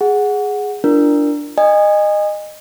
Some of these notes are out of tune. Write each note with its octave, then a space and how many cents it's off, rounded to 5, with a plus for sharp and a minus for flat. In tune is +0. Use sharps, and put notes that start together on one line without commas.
G#4 +0 F#5 -5
D4 +0 F4 -40 A#4 +0
D#5 -20 G#5 -25